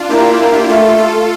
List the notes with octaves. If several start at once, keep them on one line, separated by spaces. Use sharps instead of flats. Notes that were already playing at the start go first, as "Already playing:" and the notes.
Already playing: D4 F4
A#3 E4 G4
A#3
A3 F4 A4
F4 A4